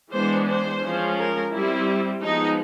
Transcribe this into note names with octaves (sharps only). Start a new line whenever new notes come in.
E3 G#3 B3 D4 C5
C5
F3 G#3 C#4
A#4
G3 C4 E4
F3 G#3 B3 D#4